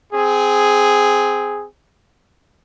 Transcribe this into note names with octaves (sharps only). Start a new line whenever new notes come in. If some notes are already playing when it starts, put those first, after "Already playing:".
C4 G#4